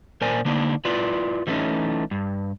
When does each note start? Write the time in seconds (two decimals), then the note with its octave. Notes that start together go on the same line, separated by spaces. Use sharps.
0.21 A#2 A#4 C5 D5 G#5
0.45 D3 A#3 D4 D#4
0.85 E4 F4 B4 D5
1.47 E3 G3 A3 B3 C#4 D#4
2.11 G2